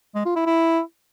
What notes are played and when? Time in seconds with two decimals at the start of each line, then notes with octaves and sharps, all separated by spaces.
0.15 G#3
0.25 F4
0.36 E4
0.46 E4